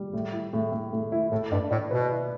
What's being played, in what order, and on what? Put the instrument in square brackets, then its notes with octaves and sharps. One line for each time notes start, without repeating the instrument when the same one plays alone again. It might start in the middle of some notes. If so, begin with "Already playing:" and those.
Already playing: [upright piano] G3
A2
E4
A2
A2
A2
E4
[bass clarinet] A2 [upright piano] A3
[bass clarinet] G2 [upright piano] D5
[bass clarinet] A2 [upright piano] D5
[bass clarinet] B2 [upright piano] B4
[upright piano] E4